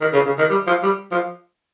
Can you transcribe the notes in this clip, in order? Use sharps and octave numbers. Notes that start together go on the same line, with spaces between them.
D#3
C#3
C#3
D#3
G3
F3
G3
F3